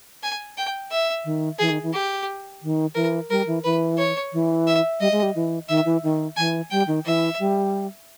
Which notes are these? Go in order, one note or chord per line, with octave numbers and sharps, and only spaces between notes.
G#5
G5
E5
D#3
E3 G#4
D#3
E3
G4
D#3
E3 A#4
G3 A#4
E3
E3 B4
C#5
E3
E5
G3 D#5
G#3
G3
E3
D#3 E5
E3
D#3
E3 G#5
G3 G5
D#3
E3 E5
G3